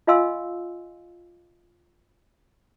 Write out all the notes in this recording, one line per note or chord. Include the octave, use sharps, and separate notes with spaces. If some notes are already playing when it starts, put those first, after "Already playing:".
F4 D#5 F5 G#5 C6 E6